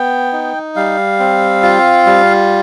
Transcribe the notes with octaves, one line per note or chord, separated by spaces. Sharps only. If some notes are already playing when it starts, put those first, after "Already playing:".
Already playing: B3 G5
D#4
G3 F5
C4
F4
G3